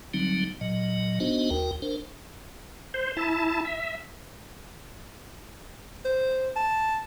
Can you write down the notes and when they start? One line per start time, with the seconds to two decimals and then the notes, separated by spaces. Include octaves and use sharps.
0.14 D3 F#3 G3 C4 D#4
0.61 A#2 F#3 D#5
1.20 B3 D4 D#4 F#4 C5 D#5
1.51 D#2 F#4 A#4 G5
1.82 D4 A#4 C5
2.94 C5
3.17 E4 A5
3.65 E5
6.05 C5
6.56 A5